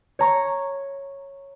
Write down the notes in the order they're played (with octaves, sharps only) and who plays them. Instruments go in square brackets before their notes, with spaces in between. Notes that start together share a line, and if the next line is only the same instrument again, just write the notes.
[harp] C#5 A#5 C#6